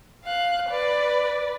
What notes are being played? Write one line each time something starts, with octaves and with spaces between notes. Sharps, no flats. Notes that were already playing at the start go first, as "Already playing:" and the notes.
F5 F#6
B4 D5